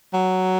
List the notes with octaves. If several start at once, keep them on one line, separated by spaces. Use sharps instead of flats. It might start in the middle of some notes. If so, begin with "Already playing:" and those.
F#3